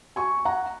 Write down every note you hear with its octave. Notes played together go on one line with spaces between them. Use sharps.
G#5 C#6
F#5 A#5